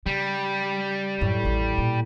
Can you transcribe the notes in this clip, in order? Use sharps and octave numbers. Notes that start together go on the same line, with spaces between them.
C#3 G3
F#2 A2
A1 D#2
A#2